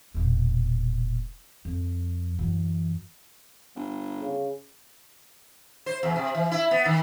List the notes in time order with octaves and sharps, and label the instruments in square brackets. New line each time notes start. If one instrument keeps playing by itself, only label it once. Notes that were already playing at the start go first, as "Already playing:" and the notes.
[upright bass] E1 A#2
F2
F#2 E3
[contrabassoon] G1
[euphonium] C#3
[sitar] C5
E2
C3
E3
E4
B3
D#3